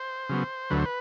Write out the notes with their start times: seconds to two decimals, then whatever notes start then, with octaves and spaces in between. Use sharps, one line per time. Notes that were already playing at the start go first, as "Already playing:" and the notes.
Already playing: C5
0.29 C#3 F#3 B3
0.70 D2 D3 F#3 B4
0.78 C5
0.85 B4